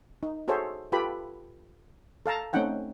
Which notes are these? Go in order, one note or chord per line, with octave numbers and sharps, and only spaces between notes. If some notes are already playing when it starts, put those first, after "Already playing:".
D#4
F#4 G#4 A4 C5 C#5 E5
F4 G4 A4 B4 B5
A4 F5 A5 A#5
A3 C4 C#4 D#4 F#5 G5